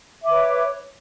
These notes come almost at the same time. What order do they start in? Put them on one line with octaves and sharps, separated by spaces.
E5 D6 B4 C#5